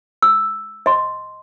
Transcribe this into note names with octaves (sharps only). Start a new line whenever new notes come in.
E6
D#5 C6